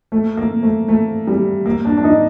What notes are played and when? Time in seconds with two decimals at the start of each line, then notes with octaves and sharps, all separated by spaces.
0.12 A3
0.37 A#3
0.63 A3
0.88 A3
1.27 G3
1.66 A#3
1.85 D4
1.98 D4
2.04 D#4